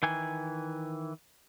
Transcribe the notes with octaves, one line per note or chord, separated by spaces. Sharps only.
D#3 E3 G#5